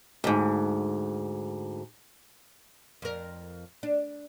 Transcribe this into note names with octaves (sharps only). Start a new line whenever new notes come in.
D2 G#2
F2 A#4
D4